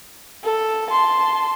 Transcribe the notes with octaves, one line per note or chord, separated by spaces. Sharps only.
A4
A5 C6